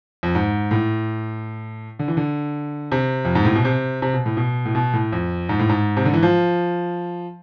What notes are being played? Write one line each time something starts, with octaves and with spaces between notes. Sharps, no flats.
F2
G#2
A2
D3
E3
D3
C3
F2
G#2
A2
B2
C3
C3
B2
A2
B2
A2
B2
A2
F2
G#2
A2
G#2
C3
D3
E3
F3